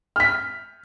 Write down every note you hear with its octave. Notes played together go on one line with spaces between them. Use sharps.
F6 B6